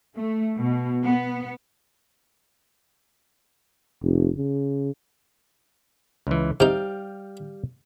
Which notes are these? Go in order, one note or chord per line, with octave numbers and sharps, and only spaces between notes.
A3
B2
B3
F1
C#3
C#2 E3
C3 G3 D#4 F5 G5